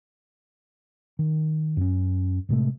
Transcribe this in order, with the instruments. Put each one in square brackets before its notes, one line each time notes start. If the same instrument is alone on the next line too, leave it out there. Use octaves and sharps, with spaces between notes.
[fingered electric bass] D#3
F#2 C#4
A2 C3 G#3 A3